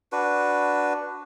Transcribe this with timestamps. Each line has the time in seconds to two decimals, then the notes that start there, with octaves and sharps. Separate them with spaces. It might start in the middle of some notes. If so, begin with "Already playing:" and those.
0.12 D4 F#4 B4